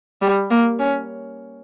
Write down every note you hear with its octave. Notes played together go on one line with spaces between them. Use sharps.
G3
A#3
C#4